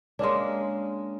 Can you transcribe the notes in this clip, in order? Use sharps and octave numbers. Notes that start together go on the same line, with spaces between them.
G#3 A#3 C#4 D4